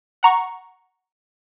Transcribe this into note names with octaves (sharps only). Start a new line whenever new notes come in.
F#5 A#5 C#6